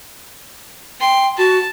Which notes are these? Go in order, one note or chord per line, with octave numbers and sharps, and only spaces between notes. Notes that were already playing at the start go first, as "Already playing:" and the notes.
G5 C6
F#4 A5